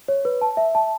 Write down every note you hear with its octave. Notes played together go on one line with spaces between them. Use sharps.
C#5
B4
A5
E5
A5